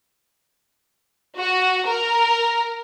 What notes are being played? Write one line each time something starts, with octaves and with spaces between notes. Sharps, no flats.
F#4
A#4